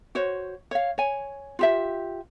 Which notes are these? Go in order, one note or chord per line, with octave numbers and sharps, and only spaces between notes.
F#4 C5 C#5
C#5 F5
C#5 G#5
F4 G4 E5